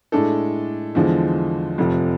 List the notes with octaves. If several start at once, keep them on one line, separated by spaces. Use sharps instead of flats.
A2 G#3 D4 A4
E2 D3 F3 G#3
F1 F2 C3 F3